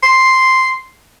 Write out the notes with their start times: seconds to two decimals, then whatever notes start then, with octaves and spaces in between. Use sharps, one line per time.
0.03 C6